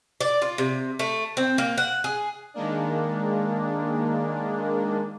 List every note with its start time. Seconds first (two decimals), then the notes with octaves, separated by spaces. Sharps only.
0.21 D5
0.42 F4
0.58 C3
0.99 A3
1.37 C4
1.58 A#3
1.78 F#5
2.04 G#4
2.54 D#3 G#3 A#3 D4